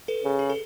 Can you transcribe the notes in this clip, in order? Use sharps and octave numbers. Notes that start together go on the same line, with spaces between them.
A4 B4
C#3
G#4
A4